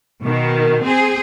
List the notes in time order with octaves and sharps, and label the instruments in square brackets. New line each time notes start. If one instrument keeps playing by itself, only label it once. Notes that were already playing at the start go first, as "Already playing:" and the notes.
[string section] B2 D#3
C4 G#4